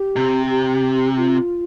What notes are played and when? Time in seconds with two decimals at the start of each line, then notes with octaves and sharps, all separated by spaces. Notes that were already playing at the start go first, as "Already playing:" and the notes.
Already playing: G4
0.16 C3
0.50 G4
1.17 F4